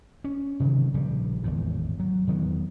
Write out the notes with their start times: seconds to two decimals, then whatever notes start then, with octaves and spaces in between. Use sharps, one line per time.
0.24 C#4
0.60 C3 D#3 E3 F#3
0.94 A#1 C#3 G3
1.44 G#1 E2 A2
2.00 F#3
2.27 E2 D#3 F#3 B3